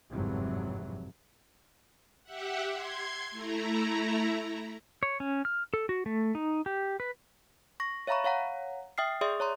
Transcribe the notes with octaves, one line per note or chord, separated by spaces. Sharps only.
G1 F2 G#2 C3 E3 F#3
G4 E5 F#5
C6 G#6
A3 E4 A#5
C#5
C#4
F6
A4
F#4
A3
D#4
G4
B4
C#6 A#6
C#5 E5 F5 A#5 B5 C#6
C#5 F5 F#5 A#5
E5 G5 D#6 F6 C7
G#4 D5 E5 C6 D#6
C#5 A#5 C6